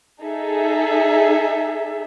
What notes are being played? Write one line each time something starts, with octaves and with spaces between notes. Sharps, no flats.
D#4 G#4 A4 E5